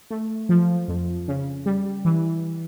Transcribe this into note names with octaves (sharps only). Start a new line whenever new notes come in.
A3
F3
F2
C#3
G3
E3